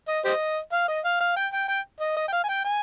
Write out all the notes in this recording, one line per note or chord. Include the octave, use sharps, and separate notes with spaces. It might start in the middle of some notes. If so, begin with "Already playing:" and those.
D#5
G4 C5 D#5
F5
D#5
F5
F5
G5
G5
G5
D#5
D#5
G5
F5
G#5
G5
G#5